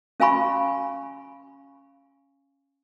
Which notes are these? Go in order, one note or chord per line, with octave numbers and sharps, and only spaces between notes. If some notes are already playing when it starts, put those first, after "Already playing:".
C#4 F5 G#5 B5 C#6